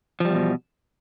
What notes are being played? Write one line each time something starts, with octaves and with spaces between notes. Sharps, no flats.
E2 B2 F3 G3